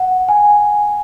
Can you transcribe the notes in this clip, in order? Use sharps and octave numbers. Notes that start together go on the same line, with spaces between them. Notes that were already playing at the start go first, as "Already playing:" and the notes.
Already playing: F#5
G#5